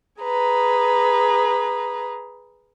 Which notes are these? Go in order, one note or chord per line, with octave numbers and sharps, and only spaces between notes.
G#4 B4 A#5